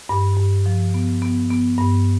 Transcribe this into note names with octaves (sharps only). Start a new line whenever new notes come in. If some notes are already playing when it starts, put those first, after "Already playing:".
G2
G2
F3
B3
B3
B3
G2